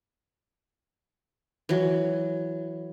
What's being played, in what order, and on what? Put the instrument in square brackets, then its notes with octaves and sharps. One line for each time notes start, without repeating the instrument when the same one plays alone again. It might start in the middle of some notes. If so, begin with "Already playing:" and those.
[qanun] E3 F#3